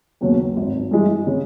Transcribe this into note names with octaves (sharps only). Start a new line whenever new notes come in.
D#2 C#3 F#3 B3
G#1
G2 E3 G#3
C#3